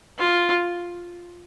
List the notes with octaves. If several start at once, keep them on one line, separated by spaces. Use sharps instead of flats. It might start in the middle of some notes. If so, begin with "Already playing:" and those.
F4